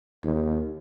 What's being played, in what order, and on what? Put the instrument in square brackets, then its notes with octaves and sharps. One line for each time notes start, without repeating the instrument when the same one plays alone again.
[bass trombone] D#2